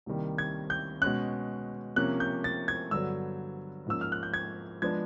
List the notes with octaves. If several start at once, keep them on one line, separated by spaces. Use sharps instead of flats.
C2 C3 D#3 G3 A#3
G#6
G6
B2 G#3 C#4 F#6
C3 F3 A#3 C#4 F#6
G6
A6
G#6
G2 D3 F#3 B3 E6
G#2 F3 A#3 C#4 E6
F6
F#6
G6
G#6
F3 G#3 B3 D4 G#6